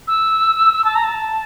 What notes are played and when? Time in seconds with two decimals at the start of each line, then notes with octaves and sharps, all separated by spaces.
0.08 E6
0.85 A5
0.95 A#5
1.04 A5